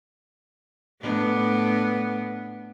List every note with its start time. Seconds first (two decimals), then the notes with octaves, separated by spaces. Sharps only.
1.02 A2 B3 D4